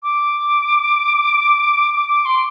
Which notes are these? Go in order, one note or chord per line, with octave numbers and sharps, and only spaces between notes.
D6
D6
D6
C6